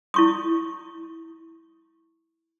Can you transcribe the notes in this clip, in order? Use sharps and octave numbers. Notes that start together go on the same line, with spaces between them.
E4 C#6 D#6